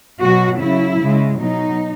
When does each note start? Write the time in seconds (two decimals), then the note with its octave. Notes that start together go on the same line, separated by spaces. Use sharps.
0.20 B2 F#3 F#4
0.60 C#3 F#3 E4
1.00 C#3 G#3
1.39 B2 F#3 D#4